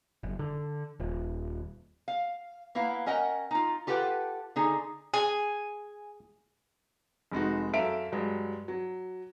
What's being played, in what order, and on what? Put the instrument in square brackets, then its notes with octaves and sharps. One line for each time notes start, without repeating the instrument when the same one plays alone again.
[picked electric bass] F#1
D3
D#1
[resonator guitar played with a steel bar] F5
A#3 B3 E4 F5
C#4 A#4 D#5 F#5 G5
D#4 F4
F4 G4 A4 B4 F#5 G5
D3 D#4 G#4
[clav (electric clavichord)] G#4 [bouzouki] G#5
[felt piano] F1 G#3 D#4 F#4
F#2 A4 E5 F5 D7
G2 F#3 G#3
F#3